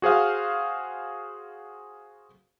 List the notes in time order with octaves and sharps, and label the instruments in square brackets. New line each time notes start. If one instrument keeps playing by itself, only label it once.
[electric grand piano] F#4 G#4 C5 F5